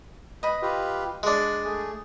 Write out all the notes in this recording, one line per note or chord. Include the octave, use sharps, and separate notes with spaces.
B4 D#5 B5
F4 G4 B4
G#3 D4 F#6
A3 G#4